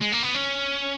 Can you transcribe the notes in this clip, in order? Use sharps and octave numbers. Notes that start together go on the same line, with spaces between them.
G#3
A#3
B3
C#4